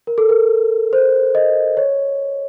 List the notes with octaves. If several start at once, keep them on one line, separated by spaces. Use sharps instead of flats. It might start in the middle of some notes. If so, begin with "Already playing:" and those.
A#4
A4
A#4
C5
D#5
C#5